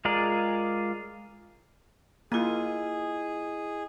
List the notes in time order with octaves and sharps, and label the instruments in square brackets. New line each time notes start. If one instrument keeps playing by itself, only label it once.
[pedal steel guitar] G#3 F4 G#4 A#4 D5
[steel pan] A#3 F4 [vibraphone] E4 D#5 [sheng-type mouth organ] G#4